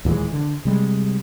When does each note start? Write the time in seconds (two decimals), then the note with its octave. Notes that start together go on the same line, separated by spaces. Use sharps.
0.05 D#2 A#2 E3 G#3
0.32 D3
0.65 C3 G3 G#3